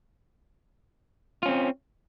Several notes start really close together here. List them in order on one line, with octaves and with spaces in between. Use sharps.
F4 C#4 C4